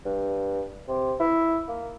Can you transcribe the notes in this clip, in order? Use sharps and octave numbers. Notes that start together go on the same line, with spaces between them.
G2
C3
E4
A#3